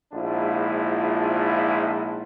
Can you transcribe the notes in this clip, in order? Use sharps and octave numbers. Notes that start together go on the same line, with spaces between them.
A#1 G#2 D4 E4 F4